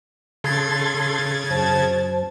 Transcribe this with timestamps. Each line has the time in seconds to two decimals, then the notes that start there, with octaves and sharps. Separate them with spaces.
0.44 C#3 A4 C6 G#6 A6
1.50 F#2 C5 A5